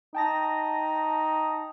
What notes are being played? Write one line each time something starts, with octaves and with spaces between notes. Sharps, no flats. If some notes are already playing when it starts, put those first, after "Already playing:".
D#4 G5 A5 A#6